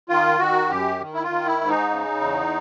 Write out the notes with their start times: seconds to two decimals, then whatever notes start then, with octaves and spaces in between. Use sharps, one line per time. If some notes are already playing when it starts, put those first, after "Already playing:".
0.09 D#3 F4
0.39 D#3 F#4
0.69 F#2 G4
1.00 D#3
1.14 E4
1.23 F4
1.30 D#3
1.46 E4
1.61 G#2
1.68 D#4
1.91 C#3
2.21 E2